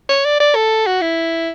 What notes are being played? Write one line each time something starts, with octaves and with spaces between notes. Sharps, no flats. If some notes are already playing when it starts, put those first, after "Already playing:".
C#5
D5
D5
A4
F#4
E4